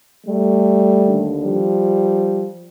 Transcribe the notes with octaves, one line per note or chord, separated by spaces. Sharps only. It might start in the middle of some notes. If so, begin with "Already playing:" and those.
G3 A3
D#2 D3
F3 G3